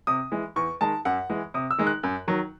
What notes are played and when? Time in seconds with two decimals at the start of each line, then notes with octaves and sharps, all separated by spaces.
0.07 C3 D#6
0.32 E3 G#3
0.56 E2 C#6
0.81 D#3 G#3 A5
1.05 F#2 F#5
1.30 E3 G#3
1.54 C3 D#6
1.71 E6
1.78 D#3 G#3
1.87 F#6
2.03 F#2
2.28 D#3 F#3